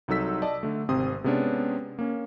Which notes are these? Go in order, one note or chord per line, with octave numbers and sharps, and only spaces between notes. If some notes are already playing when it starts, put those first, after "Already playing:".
C2 F#3 D#4 A4 E6 B6
D5 D#5 A5
D3 A3
G#1 C3 C4 C6 D#6
C3 G#3 B3 C#4 D4
A#3 C#4